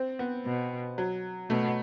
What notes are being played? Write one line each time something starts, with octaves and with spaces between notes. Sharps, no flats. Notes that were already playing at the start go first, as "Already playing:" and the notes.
Already playing: C4
B3
B2
F#3
B2 A3